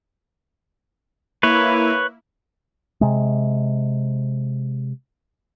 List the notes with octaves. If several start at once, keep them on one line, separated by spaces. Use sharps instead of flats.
A#3 E4 B4 C#5
C3 G#3